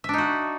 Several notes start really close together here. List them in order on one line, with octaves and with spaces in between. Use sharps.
E5 D4 D#4 F#4